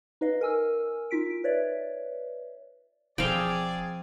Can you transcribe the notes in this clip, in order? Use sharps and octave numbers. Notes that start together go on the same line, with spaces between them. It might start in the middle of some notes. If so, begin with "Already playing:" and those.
D#4 B4 D#5 F5
A#4 G#5 E6 F6
D#4 F4 B6 D7
B4 C#5 D5 E5
E1 F3 C4 G#4 D5 F5 G5